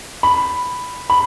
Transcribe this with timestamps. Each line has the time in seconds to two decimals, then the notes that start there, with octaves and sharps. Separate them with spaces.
0.23 B5
1.10 B5